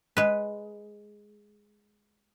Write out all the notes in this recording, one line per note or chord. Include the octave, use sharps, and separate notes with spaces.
G#3 B4